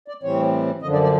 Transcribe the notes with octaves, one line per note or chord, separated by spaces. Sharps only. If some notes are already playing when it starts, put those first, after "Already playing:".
D5
A2 E3 G3 C4 C#5
F#2 D3 F3 D#5
D5
D5